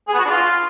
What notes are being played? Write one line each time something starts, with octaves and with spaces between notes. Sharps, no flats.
G#4
B3
F#4
D4
F4